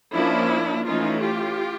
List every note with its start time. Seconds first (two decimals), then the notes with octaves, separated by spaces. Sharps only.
0.13 F3 A#3 C#4 D4 E4
0.85 E3 A3 C#4 D#4 F4
1.22 F4 G4